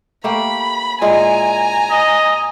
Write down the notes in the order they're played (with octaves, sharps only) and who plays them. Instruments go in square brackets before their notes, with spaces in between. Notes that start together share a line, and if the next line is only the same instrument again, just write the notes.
[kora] A3 A#3 G4 [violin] B5
[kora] A#2 G#3 E4 [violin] G#5 A#5
[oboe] D#5